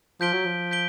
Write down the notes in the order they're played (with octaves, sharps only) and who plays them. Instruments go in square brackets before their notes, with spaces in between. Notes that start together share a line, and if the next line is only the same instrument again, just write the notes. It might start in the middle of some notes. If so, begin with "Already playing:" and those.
[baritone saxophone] F3 [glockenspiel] G6 B6 D7 G7
[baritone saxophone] F#3
F3
[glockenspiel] G6 B6 D7 G7